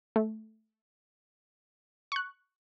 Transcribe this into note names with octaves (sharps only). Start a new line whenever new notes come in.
A3
C#6 F#6